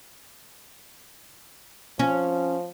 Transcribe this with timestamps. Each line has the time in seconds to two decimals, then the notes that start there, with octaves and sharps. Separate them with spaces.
1.99 F3 C#4